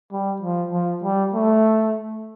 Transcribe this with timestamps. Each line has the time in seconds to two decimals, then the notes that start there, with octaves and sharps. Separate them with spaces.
0.12 G3
0.42 F3
0.72 F3
1.03 G3
1.34 A3